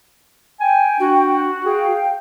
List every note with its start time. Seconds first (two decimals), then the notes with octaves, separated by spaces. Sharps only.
0.60 G5 G#5
1.00 D4 F#4
1.66 G#4 F5 G5